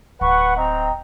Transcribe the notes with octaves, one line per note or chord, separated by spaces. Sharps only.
D1 B4 F#5 C#6
C4 D#5 G5 A#5